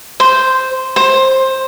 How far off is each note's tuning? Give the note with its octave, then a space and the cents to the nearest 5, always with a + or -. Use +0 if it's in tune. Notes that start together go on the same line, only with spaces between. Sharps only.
C5 -5
C5 +15